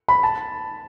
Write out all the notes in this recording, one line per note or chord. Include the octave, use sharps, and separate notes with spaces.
B5
A5